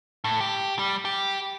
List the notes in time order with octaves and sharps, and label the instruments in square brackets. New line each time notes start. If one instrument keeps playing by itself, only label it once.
[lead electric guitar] A2
G4
G3
G4